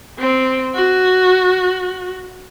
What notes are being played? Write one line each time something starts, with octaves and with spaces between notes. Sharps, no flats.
C4
F#4